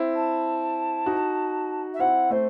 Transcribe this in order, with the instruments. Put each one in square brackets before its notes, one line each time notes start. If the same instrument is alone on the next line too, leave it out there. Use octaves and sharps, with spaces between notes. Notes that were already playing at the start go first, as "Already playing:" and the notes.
Already playing: [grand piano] C4 E4
[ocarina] A5
[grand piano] D#4 F#4
[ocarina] E5
[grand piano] C4 E4 [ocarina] F#5
[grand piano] A3 C4 [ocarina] C5